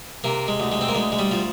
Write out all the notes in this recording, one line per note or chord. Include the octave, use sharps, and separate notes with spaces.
C3 A#3
G#3
D2
G#3
C4
A#3
D2 G#3
G#3
G3
F3